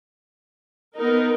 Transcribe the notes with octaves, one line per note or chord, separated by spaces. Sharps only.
B3 D#4 A#4